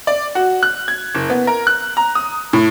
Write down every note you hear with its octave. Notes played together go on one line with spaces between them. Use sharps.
D5
F#4
F#6
G#6
F#1
B3
A#4
F#6
A#5
D#6
A2